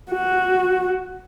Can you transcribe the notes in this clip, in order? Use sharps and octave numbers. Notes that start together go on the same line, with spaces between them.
F#4